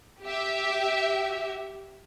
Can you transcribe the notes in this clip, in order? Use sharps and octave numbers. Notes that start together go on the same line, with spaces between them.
G4 E5